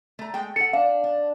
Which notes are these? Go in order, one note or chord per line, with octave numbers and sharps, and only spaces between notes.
A3 A#5
G#3 A3 G5
A4 F#5 C#7
D4 F5
D4